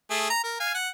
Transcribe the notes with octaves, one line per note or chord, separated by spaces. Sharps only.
A3 G#4
A#5
A#4
F5 G#5
F#5